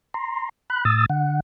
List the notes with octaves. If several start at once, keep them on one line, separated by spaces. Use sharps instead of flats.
A#5 C6
B5 F#6
A2 D#6 E6 A6
D3 F#5